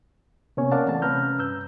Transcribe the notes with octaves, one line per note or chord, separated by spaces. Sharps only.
C3 A#3 B3 C#4 C#5 G#5
A#4 C#5 D5 F5 F#5 A5
E3 A3 C4 A5
C3 C#4 B4 A#5 F6 G6
G2 E6 G6